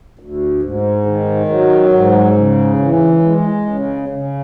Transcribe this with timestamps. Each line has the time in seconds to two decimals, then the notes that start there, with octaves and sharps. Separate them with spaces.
0.19 D2
0.62 G#2
1.06 D#3
1.49 F#3
1.92 G#2
2.36 C#3
2.79 E3
3.22 G#3
3.65 C#3
4.09 C#3